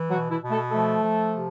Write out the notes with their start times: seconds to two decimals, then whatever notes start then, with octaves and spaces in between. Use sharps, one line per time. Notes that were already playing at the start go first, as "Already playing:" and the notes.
Already playing: E3
0.09 B2 F#3 F#4
0.30 E3 E4
0.40 B2
0.50 A3 A4
0.71 F3 A3 A4
1.02 F3
1.33 C3